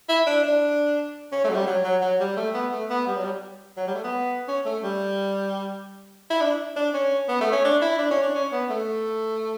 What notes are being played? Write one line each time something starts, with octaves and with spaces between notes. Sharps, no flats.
E4
D4
D4
C#4
A3
F#3
G3
F#3
F#3
F#3
G3
A3
B3
A3
B3
G3
F#3
G3
F#3
G3
A3
B3
C#4
A3
G3
E4
D4
D4
C#4
B3
A3
C#4
D4
E4
D4
C#4
D4
C#4
B3
A3